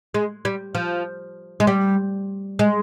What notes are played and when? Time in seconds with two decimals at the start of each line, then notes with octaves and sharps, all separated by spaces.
0.14 G#3
0.45 G3
0.75 F3
1.60 G#3
1.67 G3
2.59 G#3